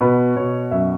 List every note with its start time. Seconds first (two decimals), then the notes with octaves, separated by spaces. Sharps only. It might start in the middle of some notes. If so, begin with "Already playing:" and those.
0.01 B2 B4
0.36 B2 C#5
0.71 F#2 E5